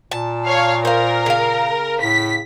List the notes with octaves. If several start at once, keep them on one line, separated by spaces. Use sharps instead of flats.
A#2 A5
C#5 F5
A#4 C5 F5
C#3 F5
A2 B6